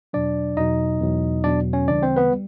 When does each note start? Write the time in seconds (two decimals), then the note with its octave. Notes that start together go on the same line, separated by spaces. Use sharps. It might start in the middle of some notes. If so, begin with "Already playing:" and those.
0.13 E2 B2 F#3 D4 D5
0.57 E2 B2 F#3 D#4 D#5
1.00 E2 B2 F#3
1.44 E2 B2 F#3 D4 D5
1.73 C#4 C#5
1.88 D2 C#3 E3 G3 D4 D5
2.02 C4 C5
2.16 B3 B4
2.32 G3